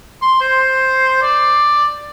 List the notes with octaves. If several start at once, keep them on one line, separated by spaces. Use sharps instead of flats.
C6
C5
D5